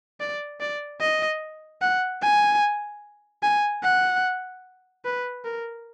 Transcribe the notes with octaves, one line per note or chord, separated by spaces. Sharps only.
D5
D5
D#5
F#5
G#5
G#5
F#5
B4
A#4